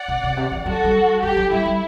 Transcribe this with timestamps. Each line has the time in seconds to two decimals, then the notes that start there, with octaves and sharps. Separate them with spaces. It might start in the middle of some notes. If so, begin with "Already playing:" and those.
Already playing: D5 F#5
0.08 B2
0.23 C3
0.34 B2
0.37 C3
0.52 E3
0.66 F#3 F#4 A4
0.84 G3
1.23 G3 G4
1.37 F#3
1.51 G3 E4
1.66 G3